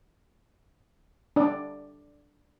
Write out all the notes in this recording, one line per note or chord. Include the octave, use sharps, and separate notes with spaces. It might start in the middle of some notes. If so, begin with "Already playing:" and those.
D4 D5